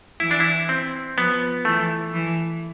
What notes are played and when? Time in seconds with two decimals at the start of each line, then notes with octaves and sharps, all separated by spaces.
0.20 E3 E4
0.31 D4
0.40 E4
0.69 C4
1.16 F3 B3
1.65 E3 A3
2.13 E3